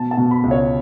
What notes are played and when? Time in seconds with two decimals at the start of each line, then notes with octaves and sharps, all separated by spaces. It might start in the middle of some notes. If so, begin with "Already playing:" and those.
Already playing: B2 A5
0.11 A5
0.17 B2
0.31 B5
0.43 C#2
0.51 C#5